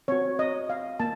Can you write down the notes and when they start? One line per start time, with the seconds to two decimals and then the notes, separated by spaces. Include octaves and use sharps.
0.08 C4 F#4 C#5
0.39 D#5
0.70 F5
1.00 A#3 A5